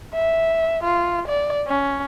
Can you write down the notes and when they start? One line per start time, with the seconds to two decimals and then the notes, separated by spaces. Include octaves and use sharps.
0.14 E5
0.84 F4
1.28 D5
1.68 C#4